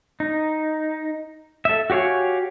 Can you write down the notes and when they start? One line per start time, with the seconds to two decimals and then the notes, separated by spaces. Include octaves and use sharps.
0.20 D#4
1.65 A4 E5
1.90 F#4 G4 C#5 F5 G#5